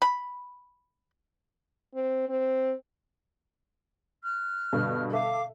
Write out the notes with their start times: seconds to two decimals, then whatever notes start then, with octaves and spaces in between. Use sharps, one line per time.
0.02 B5
1.95 C4
2.29 C4
4.21 F6 F#6
4.73 G2 B2 D3
5.12 A4 E5 F5 D6